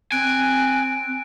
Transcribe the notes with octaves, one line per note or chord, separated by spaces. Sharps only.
C4 G#5 F#6 D7